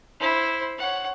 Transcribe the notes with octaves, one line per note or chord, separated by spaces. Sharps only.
E4 C5
C#5 F#5